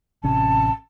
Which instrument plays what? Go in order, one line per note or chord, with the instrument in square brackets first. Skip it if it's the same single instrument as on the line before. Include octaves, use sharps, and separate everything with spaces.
[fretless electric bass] A1 C3 C#4 [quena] A5